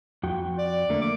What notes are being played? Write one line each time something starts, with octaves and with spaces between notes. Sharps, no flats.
F2 F#4 G5
D5
D3 A3 A#3
D6